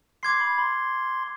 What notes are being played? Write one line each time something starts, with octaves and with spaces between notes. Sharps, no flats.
C6 D6 G#6 C7
B5
C6